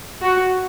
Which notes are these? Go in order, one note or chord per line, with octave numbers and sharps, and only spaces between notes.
F#4